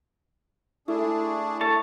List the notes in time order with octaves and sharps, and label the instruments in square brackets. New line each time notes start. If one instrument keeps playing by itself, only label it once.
[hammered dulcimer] A3 [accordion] D4 G#4 [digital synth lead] E4
[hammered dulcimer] A3 [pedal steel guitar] C#5 A5